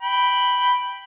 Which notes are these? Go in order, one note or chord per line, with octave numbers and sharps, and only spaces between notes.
G5 B5